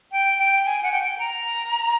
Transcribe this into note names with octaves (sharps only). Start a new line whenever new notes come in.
G5
G5
G#5
F#5
G5
A#5